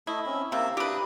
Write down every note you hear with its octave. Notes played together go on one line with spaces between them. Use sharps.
A3 E4 D#5
C4 C#4
C3 A#3 E5
D4 G4 B4 D#6